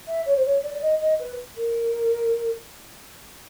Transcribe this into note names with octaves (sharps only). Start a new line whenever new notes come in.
E5
C#5
C5
C#5
D5
D5
D#5
D#5
B4
A#4